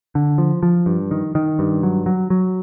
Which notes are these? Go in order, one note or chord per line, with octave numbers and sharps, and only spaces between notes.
D3
F3
F3
G2
D#3
D#3
G2
F#3
F#3
F#3